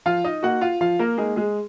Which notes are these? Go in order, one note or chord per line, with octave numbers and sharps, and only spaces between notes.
F3 F4 F5
D#4 D#5
A#3 D#4 F#4 F#5
F4 F5
F3 F4 F5
A#3 A#4
G#3 A#3 D#4 G#4
G#3 G#4